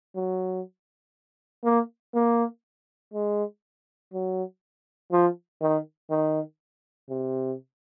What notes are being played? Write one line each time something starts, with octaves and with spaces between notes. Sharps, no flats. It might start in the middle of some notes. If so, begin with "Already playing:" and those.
F#3
A#3
A#3
G#3
F#3
F3
D#3
D#3
C3